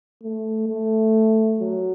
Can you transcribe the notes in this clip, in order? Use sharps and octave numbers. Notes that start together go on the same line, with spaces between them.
A3
A3
F#3